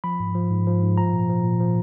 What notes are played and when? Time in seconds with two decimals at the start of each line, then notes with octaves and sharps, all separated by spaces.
0.04 F3 B5
0.20 G#2
0.35 F3
0.51 G#2
0.67 F3
0.82 G#2
0.98 F3 A#5
1.13 A#2
1.29 F3
1.44 A#2
1.60 F3